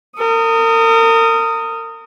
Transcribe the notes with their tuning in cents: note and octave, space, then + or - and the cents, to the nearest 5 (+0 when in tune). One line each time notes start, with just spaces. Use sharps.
A#4 -35 D#6 +0